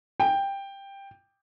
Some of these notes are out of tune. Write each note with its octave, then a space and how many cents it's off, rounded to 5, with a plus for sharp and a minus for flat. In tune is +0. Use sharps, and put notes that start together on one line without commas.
G5 +10